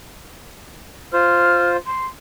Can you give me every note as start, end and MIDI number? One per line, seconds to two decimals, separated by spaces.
1.13 1.77 65
1.13 1.77 72
1.13 1.69 89
1.86 2.06 84